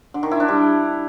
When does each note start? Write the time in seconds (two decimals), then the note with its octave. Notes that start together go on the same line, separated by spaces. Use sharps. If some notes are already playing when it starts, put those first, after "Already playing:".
0.14 D3
0.23 D#3
0.31 E4
0.40 D4
0.48 G3